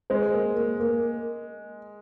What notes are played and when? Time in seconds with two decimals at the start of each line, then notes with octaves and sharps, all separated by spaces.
0.10 G#3 C5
0.33 A#3
0.56 A#3
0.80 A#3